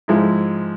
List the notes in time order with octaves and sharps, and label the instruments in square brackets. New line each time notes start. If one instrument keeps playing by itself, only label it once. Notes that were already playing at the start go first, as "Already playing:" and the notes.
[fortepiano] G#2 F3 G#3 E4